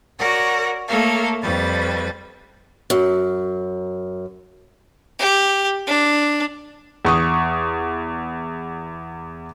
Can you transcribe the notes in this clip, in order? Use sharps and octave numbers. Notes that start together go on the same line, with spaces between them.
F#4 A#4 C#5 D5 F#5
A3 A#3 A4 A#4 C#5 F5
F2 G3 B4 A6
F#2
G4
D4
E2 C#6 D#6